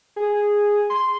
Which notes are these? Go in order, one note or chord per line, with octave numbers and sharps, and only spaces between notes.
G#4
C6